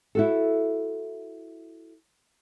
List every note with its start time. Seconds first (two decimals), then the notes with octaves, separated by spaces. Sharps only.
0.15 E4 F#4 A4